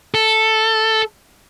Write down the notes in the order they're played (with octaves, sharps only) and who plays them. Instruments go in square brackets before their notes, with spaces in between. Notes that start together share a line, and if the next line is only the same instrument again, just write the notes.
[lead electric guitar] A4